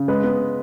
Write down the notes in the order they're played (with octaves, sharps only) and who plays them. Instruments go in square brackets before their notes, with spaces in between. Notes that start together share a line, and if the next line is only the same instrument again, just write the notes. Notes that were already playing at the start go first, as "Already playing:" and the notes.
Already playing: [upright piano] C#3
G#3 B4
B3